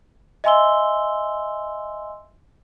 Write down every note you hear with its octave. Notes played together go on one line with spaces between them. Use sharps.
D#5 E5 G#5 C6 E6 G7